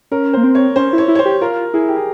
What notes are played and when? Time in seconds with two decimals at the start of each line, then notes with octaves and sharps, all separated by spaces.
0.11 C#4 A#4
0.33 A#3 C5
0.44 C4
0.55 C#5
0.76 C#4 C5
0.93 E4
0.98 C#5
1.08 E4
1.15 C#5
1.19 C5
1.25 G4
1.41 F4 A#4
1.74 E4 G#4
1.88 G4
1.96 G#4